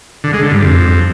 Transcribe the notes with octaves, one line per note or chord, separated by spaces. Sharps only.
D3
G#3
D3
G2
F2